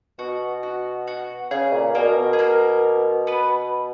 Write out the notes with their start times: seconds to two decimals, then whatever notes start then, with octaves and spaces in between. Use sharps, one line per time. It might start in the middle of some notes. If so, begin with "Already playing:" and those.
0.19 B2 F#4
0.63 F#4
1.07 F#4
1.51 C#3 G#4
1.73 A#2
1.95 B2 A#3 A#4
2.17 B2
2.33 G#4
2.39 A#3 A#4
3.27 B3 B4